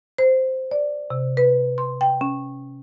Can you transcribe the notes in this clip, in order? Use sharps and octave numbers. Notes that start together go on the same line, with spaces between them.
C5
D5
C3
B4
C6
G5
C#4